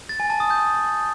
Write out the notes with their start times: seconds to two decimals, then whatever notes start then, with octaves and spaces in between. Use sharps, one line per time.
0.09 A6
0.20 G#5
0.30 A5
0.40 D#6
0.50 G6